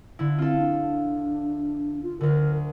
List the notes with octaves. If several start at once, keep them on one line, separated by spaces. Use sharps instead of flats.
D3 E4
C4 F4 A4
D4
F4
D2 D3 A#4